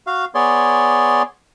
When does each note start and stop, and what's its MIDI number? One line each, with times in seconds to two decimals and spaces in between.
0.07 0.25 66
0.07 0.25 77
0.35 1.22 59
0.35 1.22 68
0.35 1.22 73
0.35 1.22 74
0.35 1.22 84